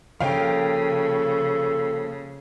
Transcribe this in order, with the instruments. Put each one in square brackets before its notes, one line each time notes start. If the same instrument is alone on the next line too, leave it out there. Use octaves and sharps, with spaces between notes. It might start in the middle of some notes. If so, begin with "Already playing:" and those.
[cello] C#3 [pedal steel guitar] F3 A#3 G4 [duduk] A4 [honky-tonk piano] F5 G5